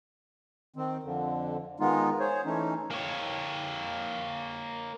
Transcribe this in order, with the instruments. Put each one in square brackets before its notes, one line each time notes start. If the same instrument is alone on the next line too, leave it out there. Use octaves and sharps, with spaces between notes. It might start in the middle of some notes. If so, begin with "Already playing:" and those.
[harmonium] D#3 C4
F2 D3
D#3 G#3 B3 D#4 F4
G#4 C5 C#5
E3 A3 C#4 D#4
[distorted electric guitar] A#3 C#5